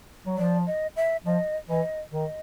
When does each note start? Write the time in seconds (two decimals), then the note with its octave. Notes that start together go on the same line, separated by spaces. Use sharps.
0.27 F#3
0.38 F3 D5
0.67 D#5
0.96 E5
1.25 F3 D#5
1.69 E3 D#5
2.12 D#3 D#5